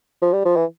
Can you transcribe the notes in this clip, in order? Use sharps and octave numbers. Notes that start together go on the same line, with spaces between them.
F3
G3
F3
E3